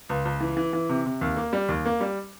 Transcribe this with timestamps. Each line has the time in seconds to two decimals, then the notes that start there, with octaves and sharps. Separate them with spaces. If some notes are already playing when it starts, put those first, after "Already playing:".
0.09 C#2
0.25 C#2
0.41 E3
0.57 E3
0.73 E3
0.89 C3
1.06 C3
1.21 D#2
1.37 A#3
1.53 G3
1.69 D#2
1.86 A#3
2.01 G3